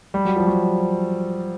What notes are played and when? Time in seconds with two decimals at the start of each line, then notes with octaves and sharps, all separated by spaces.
0.14 G3
0.25 F#3
0.36 F3
0.47 F#3